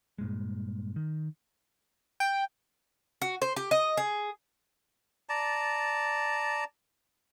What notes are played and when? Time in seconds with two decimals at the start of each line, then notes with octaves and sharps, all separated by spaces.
0.18 G2 A#2 G#3
0.96 D#3
2.20 G5
3.22 F#4
3.42 C5
3.56 G4
3.71 D#5
3.97 G#4
5.29 D5 A5 A#5